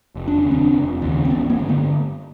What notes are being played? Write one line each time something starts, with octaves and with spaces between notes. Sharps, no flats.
F1
D4
C#4
D#2 C#3
C4 D4
F1
D#2 C#3
C4
A1 B3 C#4
A#3 C4
G2 D3
A3 B3